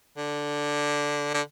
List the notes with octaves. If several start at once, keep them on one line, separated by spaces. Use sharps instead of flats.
D3
D3